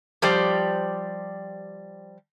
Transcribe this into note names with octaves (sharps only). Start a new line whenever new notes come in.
F3 G3 G4 C5 D5